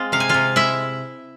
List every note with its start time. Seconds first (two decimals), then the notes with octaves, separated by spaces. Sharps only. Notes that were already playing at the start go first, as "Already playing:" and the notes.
Already playing: G#3 C4 F4
0.12 C3 F5
0.20 G#5
0.29 C3 F4 F5
0.56 G#3 E4 E5